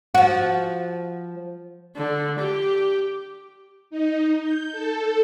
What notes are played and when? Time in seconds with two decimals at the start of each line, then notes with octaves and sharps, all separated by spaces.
0.14 F3 F#4
1.96 D3
2.39 G4
3.90 D#4
4.41 G6
4.72 A4